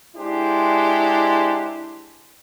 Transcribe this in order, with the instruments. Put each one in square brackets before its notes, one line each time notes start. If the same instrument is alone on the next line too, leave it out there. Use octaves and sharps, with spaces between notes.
[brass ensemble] G#3 D4 E4 G4 C5